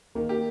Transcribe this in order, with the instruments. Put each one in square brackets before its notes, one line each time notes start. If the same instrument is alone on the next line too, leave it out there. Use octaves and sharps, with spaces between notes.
[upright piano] D#3 [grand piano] A#3
[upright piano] G4